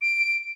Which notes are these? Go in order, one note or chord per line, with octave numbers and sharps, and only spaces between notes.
D7